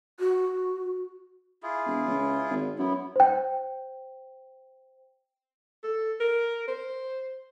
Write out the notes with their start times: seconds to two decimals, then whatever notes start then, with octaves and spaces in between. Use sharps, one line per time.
0.20 F#4
1.63 E4 F4 G#4
1.86 E1
2.07 C#2
2.50 G#1
2.78 F#2 B3 E4
3.16 C5 G5
5.84 A4
6.20 A#4
6.68 C5